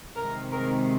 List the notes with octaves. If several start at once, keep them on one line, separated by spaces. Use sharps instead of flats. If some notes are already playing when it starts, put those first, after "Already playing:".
C3 D#3 G#3 C4 A#4
A#4